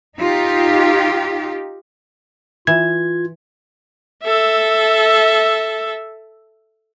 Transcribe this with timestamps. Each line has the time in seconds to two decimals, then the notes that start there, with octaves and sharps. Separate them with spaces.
0.19 D#4 F4 G4
2.67 E3 F4 G#6
4.24 A4 E5